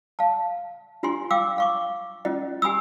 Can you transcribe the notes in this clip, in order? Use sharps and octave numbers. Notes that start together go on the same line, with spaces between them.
F5 A5
D4 F4 G4 G#5 C6
F5 G5 D6 E6
F5 C#6 D6
C#4 F4 D#5
G4 G#5 B5 D#6 E6